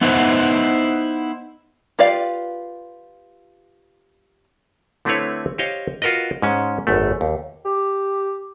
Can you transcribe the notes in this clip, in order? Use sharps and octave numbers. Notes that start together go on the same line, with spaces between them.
B3 D#4 E4 B4 C5 F#5
F4 G4 B4 D5 F5
D3 A3 C4 E4 B4 C#5
G4 C5 C#5 D#5 F5
F4 F#4 A#4 B4 D#5
G#2 G#3 C#4
G#1 F#2 A3
D#2
G4